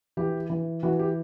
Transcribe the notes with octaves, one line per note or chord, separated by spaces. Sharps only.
E3 G4
E3
E3 F#4
G4